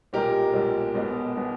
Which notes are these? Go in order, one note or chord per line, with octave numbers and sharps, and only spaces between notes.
B1 A#2 G#3 G4 A#4
B1 A#2 G#3
B1 B2 G#3 B3
B2 G#3 B3